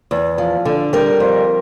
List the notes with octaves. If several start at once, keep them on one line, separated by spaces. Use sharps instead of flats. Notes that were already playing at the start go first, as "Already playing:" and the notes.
E2
F3
D3
G3 A#4
F2